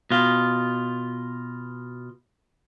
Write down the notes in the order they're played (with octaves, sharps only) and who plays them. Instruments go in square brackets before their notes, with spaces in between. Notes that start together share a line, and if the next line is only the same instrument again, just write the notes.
[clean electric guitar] B2 F4